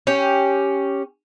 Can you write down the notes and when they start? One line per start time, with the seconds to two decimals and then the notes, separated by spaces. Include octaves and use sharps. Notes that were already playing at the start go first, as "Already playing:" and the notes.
0.07 C#4 G4